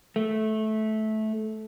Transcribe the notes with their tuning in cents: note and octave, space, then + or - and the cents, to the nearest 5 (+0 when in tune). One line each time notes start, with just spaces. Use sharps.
A3 -15